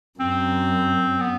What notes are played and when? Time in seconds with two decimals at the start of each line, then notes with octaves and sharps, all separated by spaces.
0.19 F#2 C4
1.21 B3